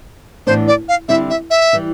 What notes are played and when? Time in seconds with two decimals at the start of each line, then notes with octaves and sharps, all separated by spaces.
0.47 A2 E3 B3 D4 C5
0.68 D5
0.89 F5
1.09 D3 G3 C4 E4 E5
1.30 E5
1.50 E5
1.73 E3 G3